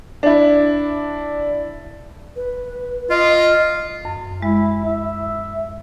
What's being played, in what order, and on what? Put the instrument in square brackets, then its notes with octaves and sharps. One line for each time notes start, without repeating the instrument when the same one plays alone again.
[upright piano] D4 E4
[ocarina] B4
[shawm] F4 [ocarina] D#5
[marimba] F#2
[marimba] G#3 [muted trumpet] E4
[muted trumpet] E5